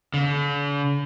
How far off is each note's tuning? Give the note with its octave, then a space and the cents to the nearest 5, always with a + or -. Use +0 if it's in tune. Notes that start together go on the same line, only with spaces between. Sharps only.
D3 -45